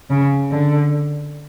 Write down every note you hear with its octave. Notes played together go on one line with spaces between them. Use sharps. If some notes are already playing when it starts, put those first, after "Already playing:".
C#3
D3